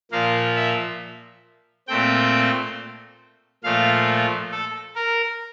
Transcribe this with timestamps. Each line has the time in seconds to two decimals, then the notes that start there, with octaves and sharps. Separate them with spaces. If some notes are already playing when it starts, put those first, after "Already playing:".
0.11 A#2 F3 A#3 F5
0.56 E5
1.88 A#2 A3 C4 G5
3.63 A#2 F3 A3 F5
4.51 A4
4.95 A#4